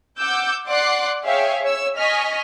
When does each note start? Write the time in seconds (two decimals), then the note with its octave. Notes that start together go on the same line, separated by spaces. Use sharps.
0.19 F#5 D6 E6 G6
0.67 D5 F#5 C6 D6 F#6 C7
1.25 G#4 C#5 E5 F5 G5
1.63 C#5 E6
1.98 D#5 G#5 C#6 F6 B6